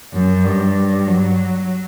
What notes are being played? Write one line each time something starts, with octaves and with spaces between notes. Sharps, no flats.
F#2
G2
F#3